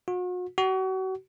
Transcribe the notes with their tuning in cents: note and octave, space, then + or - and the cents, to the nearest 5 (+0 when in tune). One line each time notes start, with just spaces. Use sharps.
F#4 -40
F#4 +35